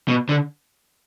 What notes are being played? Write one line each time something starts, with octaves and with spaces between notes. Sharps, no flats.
B2
D3